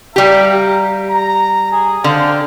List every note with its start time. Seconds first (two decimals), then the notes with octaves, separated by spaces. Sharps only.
0.16 G3 G4 E5 F5 A#5
1.10 A#5
1.71 G#4
2.04 D3 C5 F5 G5